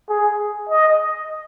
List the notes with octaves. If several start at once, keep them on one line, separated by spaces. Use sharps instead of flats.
G#4
D#5